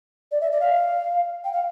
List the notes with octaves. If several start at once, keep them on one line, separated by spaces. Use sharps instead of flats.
D5
E5
D5
F5
G5
F5